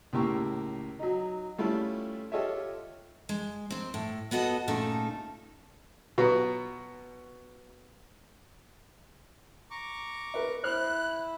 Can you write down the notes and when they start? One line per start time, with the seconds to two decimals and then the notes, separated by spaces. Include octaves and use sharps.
0.13 C#2 A2 A#3 G4 C#6
0.99 F#3 D#4
1.58 G3 A3 C#4 E4 F4
2.32 F4 G4 A4 C#5 D#5 E5
3.29 G#3
3.71 D#2 C4
3.94 A2
4.31 B3 F#4 A4 D#5
4.68 A#2 C#3 A3 D#4 A4
6.18 B2 F#3 B3
9.71 A#5 C#6 D6
10.34 A#4 B4 E5
10.64 E4 C5 F6 F#6